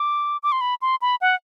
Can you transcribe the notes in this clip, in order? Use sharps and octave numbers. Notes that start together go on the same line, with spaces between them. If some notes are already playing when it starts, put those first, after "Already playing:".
Already playing: D6
D6
C6
B5
C6
B5
F#5